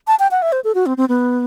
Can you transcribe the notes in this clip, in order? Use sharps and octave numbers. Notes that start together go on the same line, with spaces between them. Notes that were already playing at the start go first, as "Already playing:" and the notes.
A5
G5
F#5
E5
C5
A4
F#4
C4
C4
B3